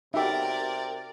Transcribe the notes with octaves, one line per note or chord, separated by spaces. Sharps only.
C3 D#4 F#4 G4 A#4 D5 E5